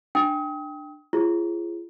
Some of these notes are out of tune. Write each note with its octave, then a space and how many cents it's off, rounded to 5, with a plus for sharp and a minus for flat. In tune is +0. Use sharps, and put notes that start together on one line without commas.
D4 +15 G5 +0 D#6 +35
F4 -40 G#4 +0 C5 +40